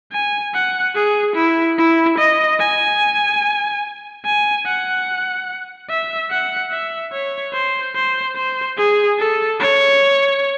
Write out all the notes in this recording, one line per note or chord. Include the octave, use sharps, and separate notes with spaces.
G#5
F#5
G#4
E4
E4
D#5
G#5
G#5
F#5
E5
F#5
E5
C#5
C5
C5
C5
G#4
A4
C#5